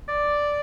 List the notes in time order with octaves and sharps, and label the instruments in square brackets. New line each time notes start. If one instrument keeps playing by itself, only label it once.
[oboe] D5